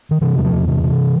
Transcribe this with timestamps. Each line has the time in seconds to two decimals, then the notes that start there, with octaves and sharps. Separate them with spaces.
0.11 D#3
0.21 C3 E3
0.37 E2 F#3
0.44 F3
0.52 E2
0.67 C3 E3
0.83 C3